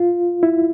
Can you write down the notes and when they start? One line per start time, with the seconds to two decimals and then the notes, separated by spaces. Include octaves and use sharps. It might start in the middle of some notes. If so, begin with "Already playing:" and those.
Already playing: F4
0.43 E4